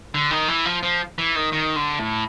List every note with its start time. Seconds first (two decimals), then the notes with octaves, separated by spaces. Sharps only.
0.15 D3
0.31 D#3
0.48 E3
0.65 F3
0.83 F3
1.18 E3
1.36 D#3
1.53 D#3
1.76 D3
1.99 A2